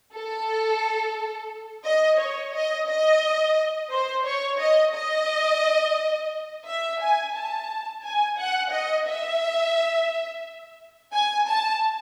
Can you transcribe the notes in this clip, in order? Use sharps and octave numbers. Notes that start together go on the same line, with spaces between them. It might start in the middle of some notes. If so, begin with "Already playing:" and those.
A4
D#5
C#5
D#5
D#5
C5
C#5
D#5
D#5
E5
G#5
A5
G#5
F#5
D#5
E5
G#5
A5